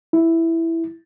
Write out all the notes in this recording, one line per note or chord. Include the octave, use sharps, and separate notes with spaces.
E4